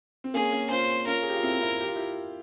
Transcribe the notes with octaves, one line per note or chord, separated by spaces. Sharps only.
C4
A#3 C#4 G#4
A#3 C#4
C#4 F4 C5
C#4 F4 A#4
G#4
G4
F4
C4 E4
C4 E4
G4
F4
E4 G4